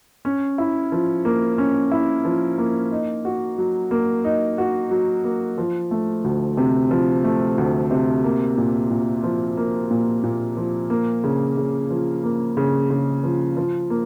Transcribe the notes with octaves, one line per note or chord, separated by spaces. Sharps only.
C#4
E4
F3
A#3
C#4
E4
F3
A#3
D#4
F#4
F#3
A#3
D#4
F#4
F#3
A#3
F3
A3
D2
C3
F3
A3
D2
C3
A#3
A#2
A#2
F3
A#3
A#2
A#2
F3
A#3
C#3
C#3
F3
A#3
C#3
C#3
F3
F3
A#3